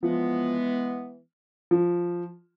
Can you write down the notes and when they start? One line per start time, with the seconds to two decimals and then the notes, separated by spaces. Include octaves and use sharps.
0.02 E3 F3 G#3 B3
1.71 F3